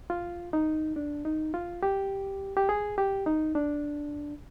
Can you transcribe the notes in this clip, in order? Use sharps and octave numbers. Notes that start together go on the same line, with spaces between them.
F4
D#4
D4
D#4
F4
G4
G4
G#4
G4
D#4
D4